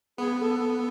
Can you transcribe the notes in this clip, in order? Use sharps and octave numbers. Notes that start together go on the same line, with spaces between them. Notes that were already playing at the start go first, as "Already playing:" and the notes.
B3 G#4
A4
A4